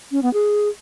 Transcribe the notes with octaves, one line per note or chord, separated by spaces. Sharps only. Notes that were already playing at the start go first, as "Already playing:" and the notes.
C#4
B3
G#4